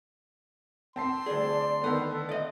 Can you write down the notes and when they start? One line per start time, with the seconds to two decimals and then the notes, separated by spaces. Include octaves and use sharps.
0.96 C4 A5 C6 C7
1.26 D2 G#4 D5
1.82 D#3 B3 D4 A4
2.29 D5 D#5